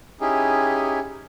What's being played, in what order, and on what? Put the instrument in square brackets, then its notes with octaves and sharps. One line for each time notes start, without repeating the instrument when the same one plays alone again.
[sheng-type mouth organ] C#4 D#4 E4 G4 G#4